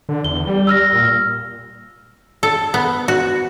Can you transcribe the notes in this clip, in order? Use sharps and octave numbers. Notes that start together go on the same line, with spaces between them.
D3
E2 G7
G3
E6 F6 A#6
A#2
A4
B3
F#4